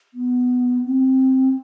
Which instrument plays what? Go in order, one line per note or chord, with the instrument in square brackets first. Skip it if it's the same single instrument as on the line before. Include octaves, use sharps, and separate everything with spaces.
[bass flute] B3
C4